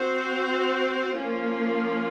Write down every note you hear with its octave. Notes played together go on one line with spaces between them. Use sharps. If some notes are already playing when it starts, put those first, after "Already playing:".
Already playing: C4 F#4 C5
F3 A#3 C#4 F4